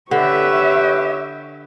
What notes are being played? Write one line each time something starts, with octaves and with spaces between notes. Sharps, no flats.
D3 G4 B4 C#5 E5